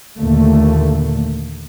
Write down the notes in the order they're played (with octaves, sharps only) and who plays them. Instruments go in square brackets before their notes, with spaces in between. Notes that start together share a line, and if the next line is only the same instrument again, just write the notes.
[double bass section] D#2 A#2 D3 A3 A#3